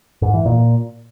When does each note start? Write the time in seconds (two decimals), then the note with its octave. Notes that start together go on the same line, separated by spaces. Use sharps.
0.22 G#2
0.34 E3
0.45 A#2